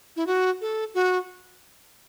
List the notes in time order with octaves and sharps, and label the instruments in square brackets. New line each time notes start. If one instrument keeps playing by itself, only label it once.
[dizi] E4
F#4
A4
F#4